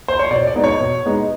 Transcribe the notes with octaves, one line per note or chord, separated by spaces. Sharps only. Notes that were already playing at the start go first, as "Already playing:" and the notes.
C5
C#5
B2 D5
D5
G#3 B3 D#4
C#5
B2
G#3 B3 D#4